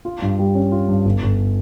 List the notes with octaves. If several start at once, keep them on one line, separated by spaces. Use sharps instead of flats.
F4
G2
G3
C#4
F4
G2
G1
G1